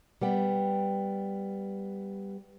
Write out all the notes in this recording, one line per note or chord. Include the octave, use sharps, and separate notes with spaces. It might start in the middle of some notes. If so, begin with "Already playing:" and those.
G3 B3 G5